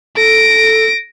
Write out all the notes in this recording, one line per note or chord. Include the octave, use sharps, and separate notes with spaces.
A4 A#6 D7